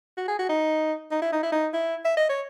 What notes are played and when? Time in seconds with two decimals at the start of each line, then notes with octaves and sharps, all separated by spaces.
0.17 F#4
0.28 G#4
0.39 F#4
0.49 D#4
1.11 D#4
1.22 E4
1.32 D#4
1.43 E4
1.52 D#4
1.73 E4
2.05 E5
2.17 D#5
2.29 C#5